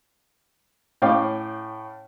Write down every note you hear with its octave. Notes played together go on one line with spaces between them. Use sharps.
A2 C#4 F5 G5 D6